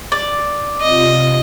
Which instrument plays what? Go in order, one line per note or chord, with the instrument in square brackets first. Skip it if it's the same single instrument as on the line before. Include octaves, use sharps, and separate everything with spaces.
[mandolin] D5
[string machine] C3 F4 [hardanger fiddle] D#5